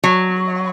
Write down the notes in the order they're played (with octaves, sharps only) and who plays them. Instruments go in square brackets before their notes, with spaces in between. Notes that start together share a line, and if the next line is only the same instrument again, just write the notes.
[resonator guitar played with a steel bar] F#3